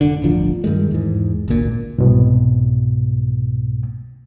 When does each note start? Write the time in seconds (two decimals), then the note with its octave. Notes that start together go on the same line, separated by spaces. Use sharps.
0.01 F1 D3
0.22 D1 G1 D3 F3
0.64 G2 D#3 G#3
0.91 E2 G#2
1.48 G#1 D2 A#2
1.98 C2 G#2 B2